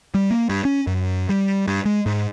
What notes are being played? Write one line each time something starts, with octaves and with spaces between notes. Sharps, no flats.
G3
A#3
G2
C#4
F#2
G3
G2
G#3
G#2